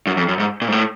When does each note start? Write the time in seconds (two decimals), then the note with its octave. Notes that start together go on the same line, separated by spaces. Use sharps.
0.07 F#2
0.17 F2
0.28 F#2
0.40 G#2
0.62 A#2
0.68 G#2
0.72 A2